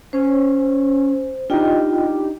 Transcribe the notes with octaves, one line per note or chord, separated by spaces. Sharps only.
C#4 C5
D4 D#4 F4 G4 D#5 G5